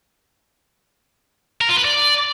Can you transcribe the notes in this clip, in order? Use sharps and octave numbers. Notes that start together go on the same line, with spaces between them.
A#4
F4
B4
D5